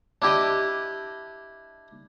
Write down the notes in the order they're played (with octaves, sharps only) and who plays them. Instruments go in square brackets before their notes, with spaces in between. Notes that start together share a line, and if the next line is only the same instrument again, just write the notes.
[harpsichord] D4 E4 G4 D#5